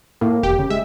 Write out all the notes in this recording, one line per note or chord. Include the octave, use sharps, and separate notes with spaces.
A2 A#3
E1 G4
C#3
G#3 E5